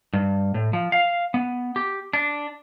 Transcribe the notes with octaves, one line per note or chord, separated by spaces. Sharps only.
G2
A2
F3
F5
B3
G4
D4